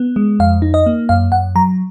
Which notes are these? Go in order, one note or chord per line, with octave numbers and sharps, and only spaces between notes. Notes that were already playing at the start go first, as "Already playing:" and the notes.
Already playing: B3
G#3
F2 F5
D#4
D#5
A#3
F#2 F5
F#2 F#5
F#3 A#5